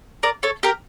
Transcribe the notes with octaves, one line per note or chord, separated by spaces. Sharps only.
A#4 D5
A4 C#5
G4 A#4